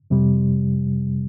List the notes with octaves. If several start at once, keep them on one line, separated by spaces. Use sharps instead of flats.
F2 C3 G3